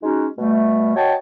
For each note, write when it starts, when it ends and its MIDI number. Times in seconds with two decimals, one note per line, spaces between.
0.03 0.27 56
0.03 0.27 61
0.03 0.27 63
0.03 0.27 66
0.38 0.95 47
0.38 0.95 55
0.38 0.95 57
0.95 1.14 66
0.95 1.14 73
0.95 1.14 75
0.95 1.14 79
0.95 1.14 81